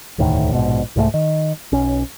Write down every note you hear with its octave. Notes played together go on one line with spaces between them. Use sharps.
E1 D2 A2 D#3
A#1 G#2 B2
C2 G#2 F3 A3
D#3
B1 C#4